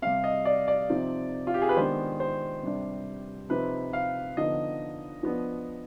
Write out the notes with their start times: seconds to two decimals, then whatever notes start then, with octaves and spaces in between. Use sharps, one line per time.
0.02 C3 G3 C4 F5
0.24 D#5
0.45 D5
0.68 D5
0.89 C3 F3 C4 D#4
1.47 F4
1.54 G4
1.62 G#4
1.69 B4
1.77 D#3 G#3 B3 D4 C5
2.20 C5
2.63 C3 G3 D4
3.49 C3 F3 C4 D#4 B4
3.93 F5
4.37 D3 F3 B3 D#4 D#5
5.23 F3 B3 D4